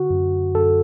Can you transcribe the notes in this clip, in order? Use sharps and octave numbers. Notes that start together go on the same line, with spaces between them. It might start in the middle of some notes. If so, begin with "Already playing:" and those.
Already playing: D3 F#4
F#2
F#2 A4